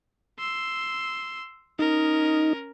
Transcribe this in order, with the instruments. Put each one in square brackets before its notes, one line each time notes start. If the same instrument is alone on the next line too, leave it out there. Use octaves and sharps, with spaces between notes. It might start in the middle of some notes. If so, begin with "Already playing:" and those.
[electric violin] C6 E6
[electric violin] C#4 A#4 [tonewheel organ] D#4